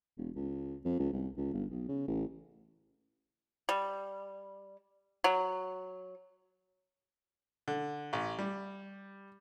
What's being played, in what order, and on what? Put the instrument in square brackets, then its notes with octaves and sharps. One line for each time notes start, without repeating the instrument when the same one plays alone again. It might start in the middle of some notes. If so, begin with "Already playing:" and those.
[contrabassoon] E1
C#2
F2
C#2
C2
C#2
G1
B1
C#3
A1
[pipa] G3
F#3
[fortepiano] D3
A1
G3